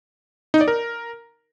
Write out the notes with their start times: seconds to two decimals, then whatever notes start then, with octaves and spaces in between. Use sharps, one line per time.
0.54 D#4
0.61 D5
0.68 A#4